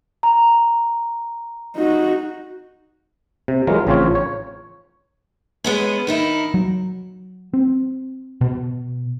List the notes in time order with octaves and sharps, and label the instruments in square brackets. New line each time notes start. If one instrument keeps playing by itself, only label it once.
[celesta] A#5
[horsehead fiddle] D#4 F#4
[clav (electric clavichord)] C3
E3 F#3 G#3 F4 A#4
A1 C#3 F3 C4 F4 C#5
C#5
[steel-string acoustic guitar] G#3 B3 C#4
D#3 D#4 E4
[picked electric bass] F#3
C4
B2